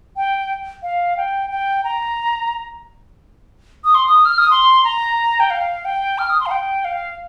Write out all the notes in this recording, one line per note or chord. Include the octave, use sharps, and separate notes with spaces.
G5
F5
G5
G5
A#5
D#6
C6
D#6
F6
D#6
C6
A#5
G5
F5
G5
F6
D#6
C6
F5
G5
F5